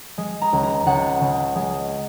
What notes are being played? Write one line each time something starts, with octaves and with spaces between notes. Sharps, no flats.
G#3
A#5
C#2
A#5
C#2 F#5
C#3
G#3